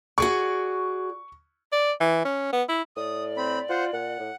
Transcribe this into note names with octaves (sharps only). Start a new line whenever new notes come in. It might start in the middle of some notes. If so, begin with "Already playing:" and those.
F#4 G#4 D5 C#6
D5
E3
C#4
B3
E4
A2 D5 D#6
C4 B5
F4 C5 F#5
A#2 F#5
A2